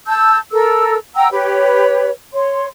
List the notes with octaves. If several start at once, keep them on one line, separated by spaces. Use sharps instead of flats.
A5 E6 G6
A4 A#4 E6
F#5 G5 A#5 E6
G4 B4 C#5
C#5 C6